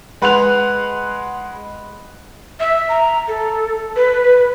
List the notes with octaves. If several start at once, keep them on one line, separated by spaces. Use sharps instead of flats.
G#3 B4 F#5 C6 F#6 F7
E5
A#5
A4
B4